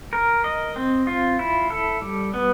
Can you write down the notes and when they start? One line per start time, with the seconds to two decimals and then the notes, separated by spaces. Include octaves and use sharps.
0.13 A#4
0.44 D#5
0.76 C4
1.07 F4
1.39 E4
1.70 A4
2.02 G3
2.34 B3